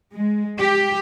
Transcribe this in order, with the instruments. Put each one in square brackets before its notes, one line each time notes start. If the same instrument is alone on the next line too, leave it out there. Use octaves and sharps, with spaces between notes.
[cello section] G#3
G4